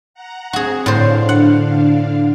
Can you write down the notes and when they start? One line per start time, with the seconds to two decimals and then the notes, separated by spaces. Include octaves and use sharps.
0.14 F#5 A#5
0.53 C4 F#4 G#4
0.86 A2 D3 D4 C5 F5
1.29 F#5